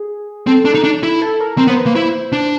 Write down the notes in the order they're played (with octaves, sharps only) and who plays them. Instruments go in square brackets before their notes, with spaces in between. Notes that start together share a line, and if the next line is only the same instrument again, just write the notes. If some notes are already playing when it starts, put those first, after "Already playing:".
Already playing: [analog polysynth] G#4
[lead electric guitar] C4 [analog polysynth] A4
[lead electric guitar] D4
D#4
D4
E4
[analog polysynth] A4
A#4
[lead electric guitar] C4 [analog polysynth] A#4
[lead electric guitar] B3 [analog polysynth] C5
[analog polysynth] B4
[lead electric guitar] A#3
[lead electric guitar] E4 [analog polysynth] C5
[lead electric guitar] D4